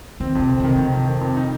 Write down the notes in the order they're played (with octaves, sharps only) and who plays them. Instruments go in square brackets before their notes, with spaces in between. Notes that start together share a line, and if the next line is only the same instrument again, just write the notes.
[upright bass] D#3 [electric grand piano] C4
[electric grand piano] F2 [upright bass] C3
[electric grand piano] C4
[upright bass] C3 [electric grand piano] D#3
[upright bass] C3 [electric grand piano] D#3
[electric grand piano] F2
D#3
F2
D#4